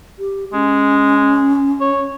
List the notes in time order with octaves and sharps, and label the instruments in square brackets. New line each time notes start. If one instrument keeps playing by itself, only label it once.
[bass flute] G4
[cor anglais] G#3 [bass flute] C#4
[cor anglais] C#5